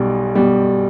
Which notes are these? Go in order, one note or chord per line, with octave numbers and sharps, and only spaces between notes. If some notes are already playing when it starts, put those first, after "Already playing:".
Already playing: B1 B2 G3
B2 G3